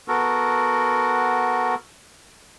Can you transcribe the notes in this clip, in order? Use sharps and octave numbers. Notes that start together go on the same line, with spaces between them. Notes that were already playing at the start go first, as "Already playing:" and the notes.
B3 F#4 A4 A#4